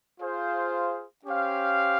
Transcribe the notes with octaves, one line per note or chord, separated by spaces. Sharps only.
F4 G#4 C5 F5
C#4 G4 C5 F5